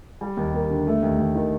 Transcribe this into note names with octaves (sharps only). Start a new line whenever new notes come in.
G3
D#2
A#3
D3
A3
D#2
D#2
D#3